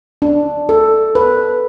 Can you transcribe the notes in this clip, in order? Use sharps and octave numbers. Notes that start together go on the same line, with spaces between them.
D4
A4
B4